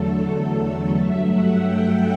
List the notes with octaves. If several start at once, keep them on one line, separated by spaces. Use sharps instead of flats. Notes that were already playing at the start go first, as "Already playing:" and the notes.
Already playing: E2 D3 F#3 A3 A4
G2 F#3 A3 E5
F#5
G5